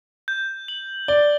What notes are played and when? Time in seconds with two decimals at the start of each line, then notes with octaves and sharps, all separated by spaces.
0.28 G6
0.68 F#7
1.08 D5 G7